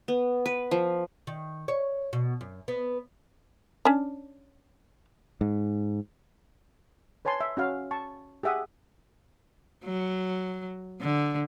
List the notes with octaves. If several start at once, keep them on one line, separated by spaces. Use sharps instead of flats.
B3
B4
F3
D#3
C#5
B2
F#2
B3
C#4 D4
G#2
B4 C#5 G#5 A5 C6
E5
C#4 F#4 F5
A5 C#6
G4 G#4 E5 F#5 D#6
F#3
D3